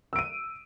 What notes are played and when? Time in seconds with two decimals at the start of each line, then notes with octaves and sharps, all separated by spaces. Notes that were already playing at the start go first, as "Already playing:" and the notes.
0.13 E6
0.16 D7
0.19 D#7